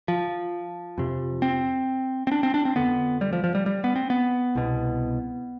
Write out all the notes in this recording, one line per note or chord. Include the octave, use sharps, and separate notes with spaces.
F3
F2 C3
C4
C4
D4
C4
D4
C4
F2 D3 B3
G3
F3
F3
G3
G3
B3
C4
B3
C2 B2